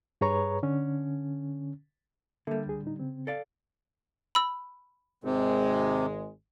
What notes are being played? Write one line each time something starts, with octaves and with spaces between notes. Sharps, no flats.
G2 G#4 B4 C#5 A#5 C#6
D3 C#4
D3 G3 A#3 A4 E5
C#2 G#4
A2 D#4
C#3 C4
A4 D5 F5
B5 E6
G#1 C3 G#3